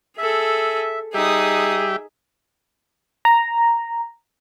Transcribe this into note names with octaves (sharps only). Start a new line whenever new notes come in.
G#4 A4 E5
G3 D#4 G4 G#4 E5 D#6
A#5